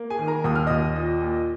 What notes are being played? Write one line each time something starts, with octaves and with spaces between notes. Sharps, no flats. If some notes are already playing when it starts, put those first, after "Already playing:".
Already playing: A#3
G#4 G#5
D#3
A#4 A#5
D#2 D#6
F6
D#2 D#5 D#6
A#2
A#2